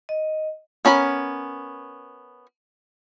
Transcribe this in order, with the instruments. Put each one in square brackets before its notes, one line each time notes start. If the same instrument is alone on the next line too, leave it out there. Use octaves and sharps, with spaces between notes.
[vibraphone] D#5
[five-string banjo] B3 C#4 A#4 B5